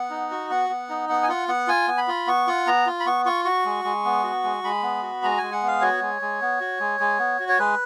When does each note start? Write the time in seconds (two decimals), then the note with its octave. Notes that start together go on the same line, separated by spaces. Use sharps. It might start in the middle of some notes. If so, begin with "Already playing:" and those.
Already playing: B3 F#5
0.10 D#4
0.31 F#4
0.50 B3 F#5
0.70 B3
0.89 D#4
1.09 B3 F#5
1.23 G#5
1.28 F4 F#5
1.48 B3 F#5
1.68 F4 G#5
1.88 B3
1.98 B5
2.08 F4
2.27 B3 C#6
2.47 F4 F#5
2.67 B3 A#5
2.86 F4
3.00 B5
3.06 B3 C#6
3.26 F4 C#6
3.45 F#4 C#6
3.65 G#3
3.84 G#3
4.05 B3
4.24 F#4
4.44 G#3
4.64 G#3 B5
4.83 B3
5.02 F#4
5.23 G#3 A#5
5.38 G#3 G#5
5.52 F#5
5.63 B3 F5
5.81 F#4 C#5
6.02 G#3
6.22 G#3
6.41 B3
6.61 F#4
6.80 G#3
7.00 G#3
7.19 B3
7.40 F#4
7.49 C#5
7.59 G#3 B4